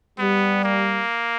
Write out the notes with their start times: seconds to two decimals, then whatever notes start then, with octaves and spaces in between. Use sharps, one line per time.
0.19 G3 B3
0.64 A#3